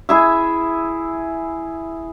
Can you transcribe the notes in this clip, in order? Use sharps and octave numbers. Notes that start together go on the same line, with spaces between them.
E4 G#4 E5